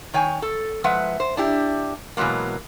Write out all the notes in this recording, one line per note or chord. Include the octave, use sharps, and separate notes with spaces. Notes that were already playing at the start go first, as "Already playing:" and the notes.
D#3 C#5 G5 G#5
A4
F3 G#3 B4 E5 F#5
C5
D4 E4 G4
B2 E3 F#3 G#3 A#3